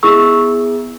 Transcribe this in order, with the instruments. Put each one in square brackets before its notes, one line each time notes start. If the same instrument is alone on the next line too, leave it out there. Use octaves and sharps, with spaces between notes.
[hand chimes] B3 E4 G#4 C#6 E6